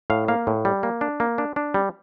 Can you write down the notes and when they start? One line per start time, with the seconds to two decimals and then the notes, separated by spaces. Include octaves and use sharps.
0.10 A2 F5
0.28 A#3 F5
0.47 A2
0.65 G3
0.83 A#3
1.01 D4
1.20 A#3
1.38 D4
1.56 D4
1.74 G3